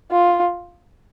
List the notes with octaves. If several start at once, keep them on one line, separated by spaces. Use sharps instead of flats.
F4